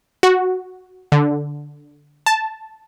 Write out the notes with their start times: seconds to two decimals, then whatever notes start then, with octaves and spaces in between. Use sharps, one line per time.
0.23 F#4
1.12 D3
2.26 A5